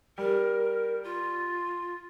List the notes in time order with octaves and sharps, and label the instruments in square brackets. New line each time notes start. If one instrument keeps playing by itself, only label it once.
[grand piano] G3 [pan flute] A#4
[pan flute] F4